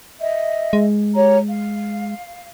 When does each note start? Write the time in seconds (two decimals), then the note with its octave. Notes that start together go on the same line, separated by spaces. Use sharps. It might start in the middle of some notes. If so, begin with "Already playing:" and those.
0.19 D#5 E5
0.73 G#3
1.14 G4 C#5 A#5
1.47 F5